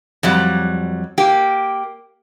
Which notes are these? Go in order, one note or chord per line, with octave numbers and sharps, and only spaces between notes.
F2 F#3 G3
A#3 G4